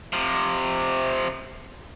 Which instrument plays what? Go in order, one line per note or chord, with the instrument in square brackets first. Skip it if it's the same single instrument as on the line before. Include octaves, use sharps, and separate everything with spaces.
[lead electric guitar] C3 F3